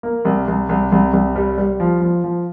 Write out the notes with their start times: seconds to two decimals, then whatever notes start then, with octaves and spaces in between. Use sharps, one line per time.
0.03 A#3
0.25 C2
0.48 C2
0.69 C2
0.92 C2
1.13 C2
1.35 G3
1.58 G3
1.80 F3
2.02 F3
2.24 F3